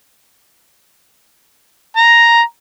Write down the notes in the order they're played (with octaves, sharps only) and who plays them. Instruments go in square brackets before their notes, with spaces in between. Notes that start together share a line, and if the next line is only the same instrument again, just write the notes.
[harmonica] A#5